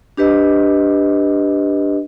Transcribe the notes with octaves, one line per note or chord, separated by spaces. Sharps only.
D4 G4 B4 D#5